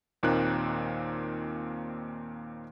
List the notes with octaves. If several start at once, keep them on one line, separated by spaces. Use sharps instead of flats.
D#2 A#2 A#3 C4 D#4 F#6